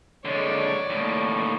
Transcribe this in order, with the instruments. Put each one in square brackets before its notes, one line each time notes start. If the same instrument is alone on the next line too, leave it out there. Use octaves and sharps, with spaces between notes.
[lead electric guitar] D3 G#3 [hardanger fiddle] C#5 D5
[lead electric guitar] D#2 A2